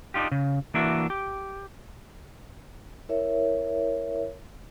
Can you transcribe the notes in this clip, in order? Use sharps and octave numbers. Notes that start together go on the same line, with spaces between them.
D4 D#4 F4 G4
C#3
E3 A#3 D4 E4 F#4
G4
E4 A#4 C#5 E5